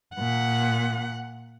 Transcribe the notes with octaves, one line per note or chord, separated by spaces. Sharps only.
A#2 F#5